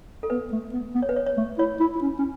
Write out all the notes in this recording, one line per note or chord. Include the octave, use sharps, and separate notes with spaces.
A4
B3 B4
A3
B3
B3
C#5
B4
C#5
C#5
A3
E4 C#5
E4
E4
C#4
C#4